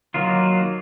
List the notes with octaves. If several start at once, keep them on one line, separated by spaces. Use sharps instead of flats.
D#3 F#3 A#3 F4